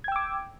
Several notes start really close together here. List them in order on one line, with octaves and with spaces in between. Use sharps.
G#6 G5 E6 D6